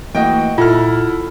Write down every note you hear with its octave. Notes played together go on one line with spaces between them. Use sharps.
E3 A3 A#3 F#4 D#5 G5
A#2 E4 F4 A4 F#5 F6